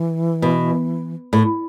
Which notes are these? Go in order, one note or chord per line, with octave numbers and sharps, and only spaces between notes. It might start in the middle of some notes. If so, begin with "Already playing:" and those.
Already playing: E3
B2
A2